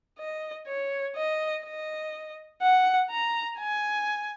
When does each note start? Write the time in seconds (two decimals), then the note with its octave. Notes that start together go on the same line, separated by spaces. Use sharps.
0.19 D#5
0.67 C#5
1.16 D#5
1.64 D#5
2.62 F#5
3.10 A#5
3.58 G#5